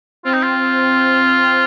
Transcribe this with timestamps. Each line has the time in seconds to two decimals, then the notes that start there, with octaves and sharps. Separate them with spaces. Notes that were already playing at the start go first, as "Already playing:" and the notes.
0.25 C4 F4
0.34 D#4
0.43 F4